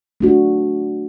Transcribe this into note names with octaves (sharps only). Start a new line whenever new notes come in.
A3 D4 F#4